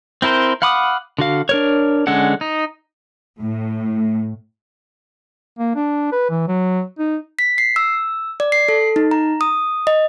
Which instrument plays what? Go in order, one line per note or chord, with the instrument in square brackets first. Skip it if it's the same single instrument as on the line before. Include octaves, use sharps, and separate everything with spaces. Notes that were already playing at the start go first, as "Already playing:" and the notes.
[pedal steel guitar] C4 E4 A#4 C5
F5 F#5 B5 D6 D#6
D3 F#4 F5
D4 A#4 C#5
D3 G#3 C#4 A4 F#5
D#4
[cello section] A2
[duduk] A#3
D4
B4
E3
F#3
D#4
[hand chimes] B6
C7
E6
D5
C7
A4
D#4
A#5
D#6
D#5